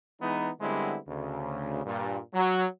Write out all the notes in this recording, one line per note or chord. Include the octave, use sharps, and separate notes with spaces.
E3 G#3 B3 D#4
D3 G3 G#3 B3 C4 E4
D2 C#3
G2 A#2
F#3